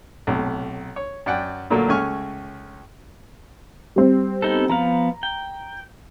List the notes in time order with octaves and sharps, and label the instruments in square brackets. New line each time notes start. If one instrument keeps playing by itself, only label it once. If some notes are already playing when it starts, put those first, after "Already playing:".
[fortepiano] B1 A2 C3
C#5
F#2 D5 F#5 G5
A#2 D3 F#3 A3 A#3
C#2 A3 C#4 G#5 C#6 F6
[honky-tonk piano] G3 C4
[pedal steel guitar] B3 D#4 A4
[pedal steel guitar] F3 B3 F5 [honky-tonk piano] A#5
[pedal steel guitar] G5